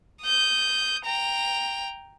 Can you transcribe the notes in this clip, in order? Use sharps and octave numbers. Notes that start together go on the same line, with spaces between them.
D#6 G6
G5 A#5